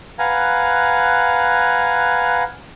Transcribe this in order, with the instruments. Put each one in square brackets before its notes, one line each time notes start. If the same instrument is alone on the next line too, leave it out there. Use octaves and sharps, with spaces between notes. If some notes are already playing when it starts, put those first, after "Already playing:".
[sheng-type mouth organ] B4 F5 F#5 G#5 A#5